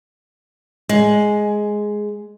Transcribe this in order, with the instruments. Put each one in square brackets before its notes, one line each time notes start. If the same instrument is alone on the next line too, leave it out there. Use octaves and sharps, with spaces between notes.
[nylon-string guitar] G#3